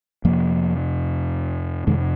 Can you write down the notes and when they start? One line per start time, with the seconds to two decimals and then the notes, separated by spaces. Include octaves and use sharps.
0.24 F2 C3 F3 A#3
1.87 F2 C3 D#3 G#3